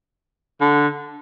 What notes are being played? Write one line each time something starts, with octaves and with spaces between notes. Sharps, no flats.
D3